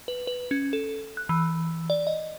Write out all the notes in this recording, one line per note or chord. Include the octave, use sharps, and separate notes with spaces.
B4
B4
C#4
A4
F#6
E3
D5
D#5